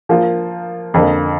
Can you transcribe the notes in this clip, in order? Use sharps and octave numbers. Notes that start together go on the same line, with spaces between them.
F3 A#3 F4 A#4
F2 D3 A#3